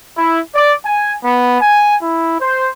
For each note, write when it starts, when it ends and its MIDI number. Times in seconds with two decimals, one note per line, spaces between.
0.18 0.40 64
0.55 0.73 74
0.85 1.15 80
1.24 1.59 59
1.61 1.95 80
2.02 2.39 64
2.41 2.69 72